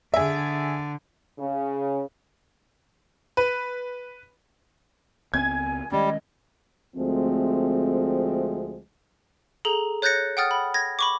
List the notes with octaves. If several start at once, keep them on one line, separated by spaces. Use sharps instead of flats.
D3 G#4 E5
C#3
B4
C#2 B3 C4 G#5 G#6
D#3 G3 G#3 C#4 D#5
D2 F3 G#3 A3 C4
G#4 A4 A#5
C#5 F#6 G6 A6 A#6 C#7
F#5 G5 D#6 F6 A6
B5
G#6 A#6
B5 C#6 D6